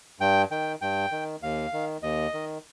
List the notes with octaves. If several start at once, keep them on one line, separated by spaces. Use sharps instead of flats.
G2 G5
D#3 G5
G2 G5
D#3
D#2 F5
D#3
D#2 D#5
D#3